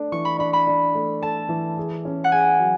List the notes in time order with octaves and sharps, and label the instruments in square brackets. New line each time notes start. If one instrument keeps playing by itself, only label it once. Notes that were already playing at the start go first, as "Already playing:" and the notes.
Already playing: [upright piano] A3 D4
[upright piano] E3 [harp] C#6
[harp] B5
[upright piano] D4 [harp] B5
[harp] B5
[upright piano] D4
A3
[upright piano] A4 [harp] A5
[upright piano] E3
G#4
C#4
[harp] F#5
[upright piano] G#4 [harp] G#5
[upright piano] F#3